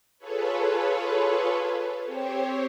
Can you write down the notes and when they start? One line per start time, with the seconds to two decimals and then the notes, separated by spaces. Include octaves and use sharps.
0.18 F4 G#4 A4 B4 C#5
2.06 C4 G4 C5 C#5